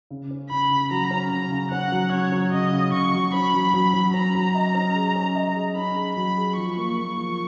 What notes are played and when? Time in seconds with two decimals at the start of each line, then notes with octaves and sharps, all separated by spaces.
0.10 C#3
0.31 C#4
0.50 C#3 B5
0.70 C#3
0.91 F#3 A#5
1.11 C#4
1.31 C#3 A#5
1.52 C#3
1.71 C#4 F#5
1.92 F#3
2.12 C#3 C#5
2.32 F#3
2.52 C#3 D#5
2.73 C#3
2.93 C#3 C#6
3.13 F#3
3.33 C#4 B5
3.54 F#3
3.74 F#3
3.94 F#3
4.14 C#4 A#5
4.35 F#3
4.55 D#5
4.75 C#4
4.95 G#4
5.15 C#4
5.35 D#5
5.55 G#4
5.75 C#4 B5
5.96 G#4
6.16 F#3 B5
6.37 G#4
6.56 F3 C#6
6.77 A#3
6.96 A#3
7.17 F3